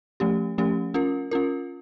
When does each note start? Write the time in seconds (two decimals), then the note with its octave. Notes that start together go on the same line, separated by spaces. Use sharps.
0.20 F3 A3 C#4 G4
0.58 F3 A3 C#4 G4
0.94 C#4 F4 A#4
1.31 C#4 F4 A#4